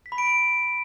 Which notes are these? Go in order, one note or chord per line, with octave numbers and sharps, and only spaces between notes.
B6
B5
D7